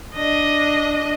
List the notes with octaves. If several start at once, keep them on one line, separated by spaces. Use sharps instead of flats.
D4 D#5